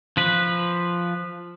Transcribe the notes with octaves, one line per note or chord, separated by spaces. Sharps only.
F3 B4